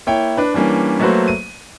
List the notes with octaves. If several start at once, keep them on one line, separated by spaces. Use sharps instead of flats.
A#3 E4 C#5 G5
D4 B4
E3 G3 A#3 C#4 D4
F#3 A3 A#3 F#4 B4 C5
D#7